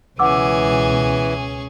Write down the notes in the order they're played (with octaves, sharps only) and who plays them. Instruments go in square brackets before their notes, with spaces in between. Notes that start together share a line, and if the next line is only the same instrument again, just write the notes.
[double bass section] C#2 B2 [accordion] E3 [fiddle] C#4 G#4 [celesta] F#5 D6 E6